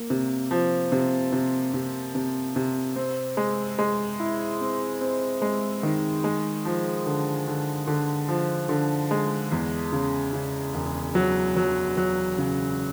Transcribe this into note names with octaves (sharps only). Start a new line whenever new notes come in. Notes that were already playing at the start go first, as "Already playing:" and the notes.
Already playing: A#3
C3
F3
C3
C3
C3
C3
C3
C4
G#3
G#3
E4
C4
C4
G#3
D#3
G#3
F3
D3
D3
D3
F3
D3
G#3
E2
C#3
C#3
E1
F#3
F#3
F#3
C#3